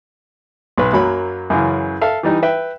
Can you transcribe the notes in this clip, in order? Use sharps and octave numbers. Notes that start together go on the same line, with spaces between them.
B1 B4
F#2 F#3 A#3 B5
F#2 C#3 E3
A4 E5 F5
E3 G3 D#4
B4 E5 G5